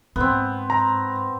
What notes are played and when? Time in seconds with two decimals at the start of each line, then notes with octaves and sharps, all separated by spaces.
0.16 G#2 B3 C4
0.70 A#5